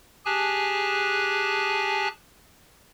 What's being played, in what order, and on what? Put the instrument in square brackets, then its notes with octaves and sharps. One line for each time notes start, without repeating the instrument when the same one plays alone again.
[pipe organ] G4 G#4 G#5 A5 F#6